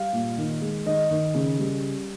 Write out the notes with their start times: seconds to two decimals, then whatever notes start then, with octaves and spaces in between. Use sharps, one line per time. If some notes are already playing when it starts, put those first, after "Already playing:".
Already playing: G3 F5
0.13 A#2
0.38 D#3
0.61 G#3
0.86 D#3 D#5
1.11 D#3
1.35 C#3
1.59 G3